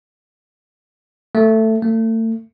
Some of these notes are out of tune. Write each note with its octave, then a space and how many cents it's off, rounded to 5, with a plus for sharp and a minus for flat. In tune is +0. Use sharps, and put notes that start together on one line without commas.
A3 +10
A3 +35